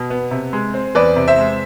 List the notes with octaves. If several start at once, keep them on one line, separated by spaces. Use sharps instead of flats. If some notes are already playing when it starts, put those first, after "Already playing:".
Already playing: B2
B3
C3
G#3
C4
E2 B4 D5
C3
C5 E5
G#3